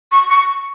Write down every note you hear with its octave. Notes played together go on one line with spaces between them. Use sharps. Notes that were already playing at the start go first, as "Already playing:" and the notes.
C#6
C#6